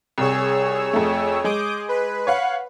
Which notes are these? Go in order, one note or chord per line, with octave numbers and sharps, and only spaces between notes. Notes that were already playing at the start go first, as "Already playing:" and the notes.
C2 G#4 C#5 E6
F2 A3
G#3 G#4 D6 D#6 G6
B4
C#5 F5 F#5